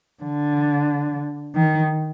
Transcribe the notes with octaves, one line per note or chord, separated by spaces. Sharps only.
D3
D#3